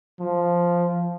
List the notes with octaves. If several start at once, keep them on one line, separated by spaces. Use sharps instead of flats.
F3